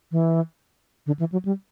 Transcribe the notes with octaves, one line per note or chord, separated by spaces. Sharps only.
E3
D3
E3
F#3
G3